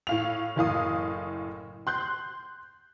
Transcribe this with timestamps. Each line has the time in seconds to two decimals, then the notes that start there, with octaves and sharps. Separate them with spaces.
0.07 A2 F5 F7
0.56 F#1 A2 F5 D#6
1.87 C6 F#6 G6